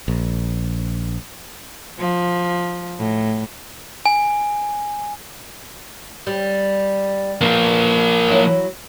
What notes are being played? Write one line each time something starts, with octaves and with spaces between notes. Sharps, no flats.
A#1
F3
A2
G#5
G3
E2 E3 F3 A#3
F#3 E4